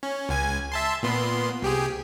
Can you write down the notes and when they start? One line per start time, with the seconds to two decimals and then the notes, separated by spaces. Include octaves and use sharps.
0.03 C#4
0.29 C#2 G#5
0.72 E5 A5 C6
1.03 A#2 B3 C6
1.62 C2 G4 G#4